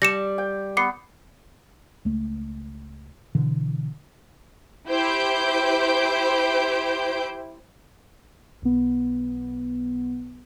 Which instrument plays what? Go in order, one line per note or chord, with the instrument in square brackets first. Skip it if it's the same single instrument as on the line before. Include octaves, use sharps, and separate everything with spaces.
[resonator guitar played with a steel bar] G3 [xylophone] A#6 C#7 E7
[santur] G5
[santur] B3 [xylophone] D6 C7 C#7
[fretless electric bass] C#2 A3
B2 D3 E3
[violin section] E4 G4 C5 G6 D7
[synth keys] B1 B3